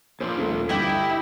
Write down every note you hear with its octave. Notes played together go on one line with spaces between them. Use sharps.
A#2 F3 D4 C5
D#1 A3
G1 D2 G2 E4 G4 D#5 G5